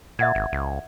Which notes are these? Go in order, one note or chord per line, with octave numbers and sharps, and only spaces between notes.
A#2 E5 F#5 G#6
G#1
C#2